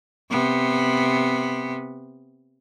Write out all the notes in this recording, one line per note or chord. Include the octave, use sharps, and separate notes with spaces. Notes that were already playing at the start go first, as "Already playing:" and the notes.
C3 B3